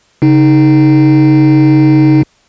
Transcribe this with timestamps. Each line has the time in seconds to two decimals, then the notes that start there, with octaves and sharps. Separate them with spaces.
0.22 C#3 D#4